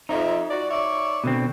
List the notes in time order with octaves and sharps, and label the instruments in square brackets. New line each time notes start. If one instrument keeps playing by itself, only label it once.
[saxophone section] F2 E5 [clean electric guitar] D#4
[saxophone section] F#4 D5
C#5 D5 E5
[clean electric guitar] B2 D3 C4